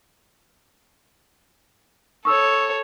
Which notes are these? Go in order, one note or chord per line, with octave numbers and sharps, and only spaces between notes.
A4 C#5 C#6 D#6 E6